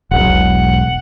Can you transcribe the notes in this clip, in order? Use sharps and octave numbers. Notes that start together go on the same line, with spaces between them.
E1 B1 F#5